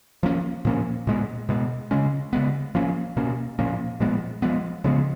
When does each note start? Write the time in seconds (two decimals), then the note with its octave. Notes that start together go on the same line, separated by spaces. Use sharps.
0.23 F3 A#3 C#4
0.65 A#2 F3 A#3 C#4
1.07 A#2 G#3 B3
1.49 B2 G#3 B3
1.91 C#3 G#3 C#4
2.33 C#3 G#3 B3
2.75 F3 A#3 C#4
3.17 B2 A#3 C#4
3.59 A#2 F3 A#3 C#4
4.00 A#2 F3 G#3 B3
4.42 F3 G#3 B3
4.84 C#3 F3 G#3 B3